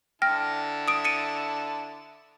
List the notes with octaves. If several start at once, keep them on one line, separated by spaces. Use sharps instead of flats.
D3 E4 G5 A5 F6 A#6
D#6 D7
C#7 D#7